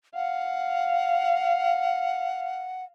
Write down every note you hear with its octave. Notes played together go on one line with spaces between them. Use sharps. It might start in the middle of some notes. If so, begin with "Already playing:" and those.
F5 F#5